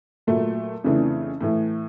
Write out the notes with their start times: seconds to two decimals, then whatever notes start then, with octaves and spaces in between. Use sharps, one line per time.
0.27 A#2 F#3 A3
0.84 F2 C#3 E3 A3 D4
1.41 A2 E3 A3